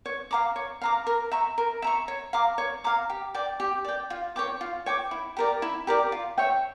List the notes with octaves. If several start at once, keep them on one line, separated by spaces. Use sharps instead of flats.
C#5
F5 A#5 D6
C#5
F5 A#5 D6
A#4
E5 A#5 C#6
A#4
E5 A#5 C#6
C#5
F5 A#5 D6
C#5
F5 A#5 D6
G4
D5 G5
G4
D5 G5
F4
C#5 G5 D6
F4
C#5 G5 D6
E4
G4 A#4 D5
E4
G4 A#4 D5
F4
C#5 E5 G5